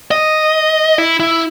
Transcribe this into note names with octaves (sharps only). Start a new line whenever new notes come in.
D#5
E4
E4